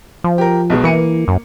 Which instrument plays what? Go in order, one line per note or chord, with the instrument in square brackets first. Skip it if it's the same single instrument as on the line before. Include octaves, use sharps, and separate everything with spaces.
[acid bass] F3
[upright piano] G4 A#4
B1 B2 G#3
[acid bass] E3 [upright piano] A#3 C#7 D#7
[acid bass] F#2